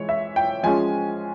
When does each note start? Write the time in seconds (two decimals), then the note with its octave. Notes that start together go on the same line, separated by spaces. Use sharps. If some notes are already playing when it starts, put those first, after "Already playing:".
Already playing: E3 G#3 C#5
0.09 E5
0.36 G5
0.63 F3 G#3 C#4 G#5